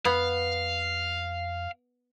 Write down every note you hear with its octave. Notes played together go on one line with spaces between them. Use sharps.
F2 B3 F5